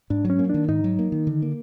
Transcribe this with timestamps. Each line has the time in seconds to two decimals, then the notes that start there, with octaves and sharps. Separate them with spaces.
0.10 G#2 D4
0.25 F#3
0.30 C#4
0.39 A#3
0.50 D#3 D4
0.68 G#2 D#4
0.84 F#3
0.99 A#3
1.12 D#3
1.27 D3
1.42 A#3